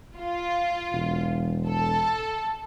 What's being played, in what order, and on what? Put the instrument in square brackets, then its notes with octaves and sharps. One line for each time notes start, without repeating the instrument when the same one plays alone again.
[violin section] F4
[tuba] E1
[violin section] A4